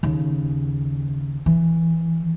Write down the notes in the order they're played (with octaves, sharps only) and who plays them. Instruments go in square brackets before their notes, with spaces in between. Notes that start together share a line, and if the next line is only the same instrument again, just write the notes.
[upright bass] D#2 C#3
E3